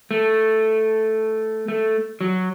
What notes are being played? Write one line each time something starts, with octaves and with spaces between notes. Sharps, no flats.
A3
A3
F#3